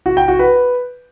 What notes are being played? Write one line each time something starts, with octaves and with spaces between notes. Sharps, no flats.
F#4
G5
F#4
B4